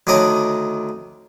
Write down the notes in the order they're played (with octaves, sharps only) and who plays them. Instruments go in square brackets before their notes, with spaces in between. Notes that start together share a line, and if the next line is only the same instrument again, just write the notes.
[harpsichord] D2 D#3 D4 C#5 D#5 D6